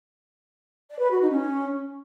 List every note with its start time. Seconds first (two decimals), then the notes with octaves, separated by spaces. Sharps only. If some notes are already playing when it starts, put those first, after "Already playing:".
0.89 D5
0.99 B4
1.10 F#4
1.20 D#4
1.30 C#4